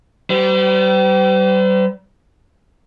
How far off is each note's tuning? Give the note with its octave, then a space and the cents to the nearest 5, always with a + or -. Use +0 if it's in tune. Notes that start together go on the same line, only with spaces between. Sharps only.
G3 -35 C5 -45